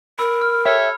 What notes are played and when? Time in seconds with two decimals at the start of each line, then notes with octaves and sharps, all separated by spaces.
0.19 A#4 B5 E6
0.42 F6
0.65 G4 A4 C#5 E5